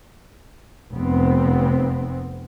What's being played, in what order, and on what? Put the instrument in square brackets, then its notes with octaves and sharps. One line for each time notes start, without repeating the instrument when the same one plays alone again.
[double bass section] F1 B3 C4